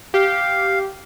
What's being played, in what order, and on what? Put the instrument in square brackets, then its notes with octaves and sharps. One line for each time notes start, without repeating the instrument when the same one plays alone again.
[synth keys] G4 [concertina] F5